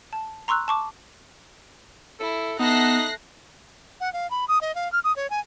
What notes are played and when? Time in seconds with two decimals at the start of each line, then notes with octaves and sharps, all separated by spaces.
0.13 A5
0.48 A#5 C6 C#6 E6 F#6
0.68 A5 C#6 D6
2.20 E4 A4
2.59 B3 D#4 A4 E5 F#6 A#6 C7
4.01 F#5
4.13 F5
4.31 B5
4.48 D#6
4.61 D#5
4.75 F5
4.92 F6
5.04 D#6
5.16 C#5
5.30 G#5